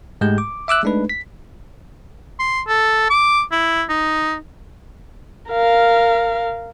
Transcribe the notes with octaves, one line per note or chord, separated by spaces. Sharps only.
G#2 G#3 A3 G4 G6
D6
E5 D6 E6 F#6
G#3 A3 D4 D#4 B4
B6
C6
A4
D6
E4
D#4
A#4 F5